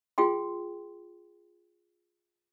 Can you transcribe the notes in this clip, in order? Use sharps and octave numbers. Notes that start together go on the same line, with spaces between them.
F4 G#4 G5 C6